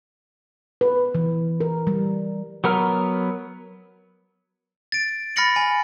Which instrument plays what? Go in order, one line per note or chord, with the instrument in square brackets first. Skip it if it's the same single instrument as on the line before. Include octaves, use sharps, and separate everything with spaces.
[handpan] B4
E3
A#4
G3
[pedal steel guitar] F#3 B3 A#4 F6
[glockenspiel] A6 D7
B5 F6 A6 A#6 C#7 F#7
G#5